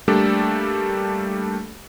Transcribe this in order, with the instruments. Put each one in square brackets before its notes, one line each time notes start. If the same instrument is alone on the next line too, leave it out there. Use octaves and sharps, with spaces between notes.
[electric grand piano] G3 A3 A#3 D4 G4 A4